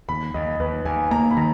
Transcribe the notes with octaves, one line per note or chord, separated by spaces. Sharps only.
D#2 B5
D#2 D#5
D#2 B4
D#2 G#5
A#3 A#5
B5
D#3 A#5